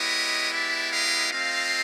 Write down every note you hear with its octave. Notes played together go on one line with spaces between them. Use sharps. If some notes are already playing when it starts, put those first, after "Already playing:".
Already playing: G#3 B3 E4 G4 C#5 D#5
D5 E5
D#5 F5
A3 C4 F4 D#5 F5